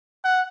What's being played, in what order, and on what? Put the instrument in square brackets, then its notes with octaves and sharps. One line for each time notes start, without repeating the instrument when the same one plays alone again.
[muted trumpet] F#5